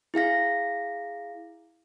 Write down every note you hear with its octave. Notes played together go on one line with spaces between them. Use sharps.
E4 G#4 F5 A#6